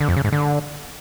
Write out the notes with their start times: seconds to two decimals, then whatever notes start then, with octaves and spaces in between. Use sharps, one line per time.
0.01 D3
0.09 F2
0.17 C#3
0.25 G#2
0.33 D3